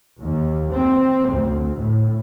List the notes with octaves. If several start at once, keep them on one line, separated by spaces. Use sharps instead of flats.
D#2
C4
D2
A2